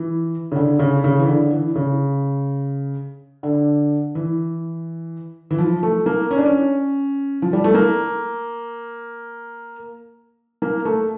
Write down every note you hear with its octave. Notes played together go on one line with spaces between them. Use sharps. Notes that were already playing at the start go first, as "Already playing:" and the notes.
Already playing: E3
C#3
D3
C#3
C#3
E3
D3
E3
C#3
D3
E3
E3
F3
A3
A#3
C#4
D4
C#4
F3
G3
A3
A#3
A#3
A3